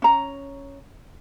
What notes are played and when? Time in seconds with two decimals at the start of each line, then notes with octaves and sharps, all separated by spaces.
0.02 C#4 A#5